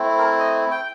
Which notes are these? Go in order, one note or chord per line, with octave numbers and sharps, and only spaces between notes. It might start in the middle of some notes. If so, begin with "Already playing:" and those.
Already playing: A3 C4 E4
A#4
D#5
G5